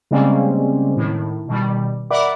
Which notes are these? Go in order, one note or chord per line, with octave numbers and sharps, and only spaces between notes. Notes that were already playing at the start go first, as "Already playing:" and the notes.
C#3 G3 G#3 A#3 C4 C#4
A2 D#3
B2 D#3 G3
A#4 D5 E5 F#5 B5 D6